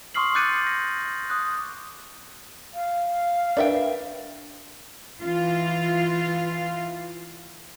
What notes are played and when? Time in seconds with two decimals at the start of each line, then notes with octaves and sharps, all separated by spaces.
0.14 C6 C#6 D#6 F6 C7 F#7
0.35 D6 F#6 G6 A6 C#7 D#7
0.67 A#6
1.30 D#6 F#6
2.74 F5
3.57 D4 A#4 B4 D5 E5 G5
5.20 E3 F4 F5